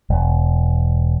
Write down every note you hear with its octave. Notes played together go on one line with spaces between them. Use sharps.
E1